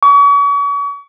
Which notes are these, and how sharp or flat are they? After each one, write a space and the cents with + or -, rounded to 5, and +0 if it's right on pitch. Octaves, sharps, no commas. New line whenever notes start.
C#6 +40